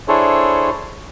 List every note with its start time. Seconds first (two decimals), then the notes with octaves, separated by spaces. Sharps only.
0.08 D4 E4 G#4 A4 C5 C#5